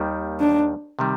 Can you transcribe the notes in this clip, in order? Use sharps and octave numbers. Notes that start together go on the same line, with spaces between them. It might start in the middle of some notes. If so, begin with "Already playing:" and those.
Already playing: D#2 D#3 G3
D4
C3 D#3 G3